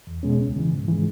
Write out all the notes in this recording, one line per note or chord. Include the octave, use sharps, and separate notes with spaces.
E2
B2 G#3 C#4
C#2
C#3 E3
G#2
E3 G#3